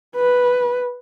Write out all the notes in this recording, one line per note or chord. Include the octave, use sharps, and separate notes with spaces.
B4